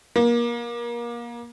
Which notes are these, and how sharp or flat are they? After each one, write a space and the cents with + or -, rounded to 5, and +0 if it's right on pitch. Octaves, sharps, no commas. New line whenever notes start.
A#3 +30